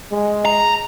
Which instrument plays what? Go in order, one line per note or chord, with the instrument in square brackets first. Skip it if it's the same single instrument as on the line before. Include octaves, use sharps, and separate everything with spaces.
[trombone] G#3
[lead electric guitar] A#5